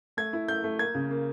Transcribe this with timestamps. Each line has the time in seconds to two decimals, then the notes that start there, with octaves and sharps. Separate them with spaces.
0.17 A3 G#6
0.33 E4
0.48 A3 G6
0.64 A3
0.79 A#3 G#6
0.95 C#3
1.11 A#3